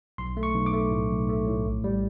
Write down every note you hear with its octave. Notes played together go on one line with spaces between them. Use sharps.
B1 C6
A3
C#6
B1
D6
A3
A2
B1
A3
A2
A#1
G3